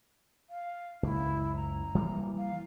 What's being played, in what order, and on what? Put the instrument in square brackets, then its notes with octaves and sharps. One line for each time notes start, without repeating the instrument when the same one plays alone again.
[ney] F5
[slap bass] F#1 C#2 [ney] E4
[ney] A#5
[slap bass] E3 G3 A#3
[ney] F5